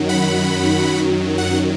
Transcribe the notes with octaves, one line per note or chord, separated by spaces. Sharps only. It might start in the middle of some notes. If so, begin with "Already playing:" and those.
Already playing: F#2 D#3 F#3
F#5 B5
F#5